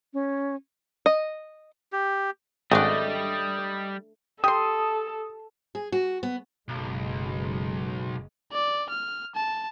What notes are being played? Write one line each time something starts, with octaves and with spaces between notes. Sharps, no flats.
C#4
D#5
G4
G#1 G3 A3 D4 D5 D#5
G4 A4 C6 D#6
G#4
F#4
B3
F#1 B1 G#3
D5
F6
A5